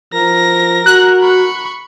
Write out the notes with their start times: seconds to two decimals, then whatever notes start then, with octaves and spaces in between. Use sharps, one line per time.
0.14 F3 A#4 A#6
0.86 F#4 F#6
1.21 B5 C#6